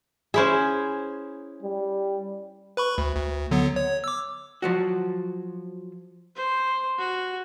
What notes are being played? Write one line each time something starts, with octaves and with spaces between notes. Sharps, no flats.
C#4 E4 G#4 C5 E5
G3
B4 B5 C#6
D2
D2
D3 F#3 B3
C#5
D6 E6
F3 F#3 F#4
C5
F#4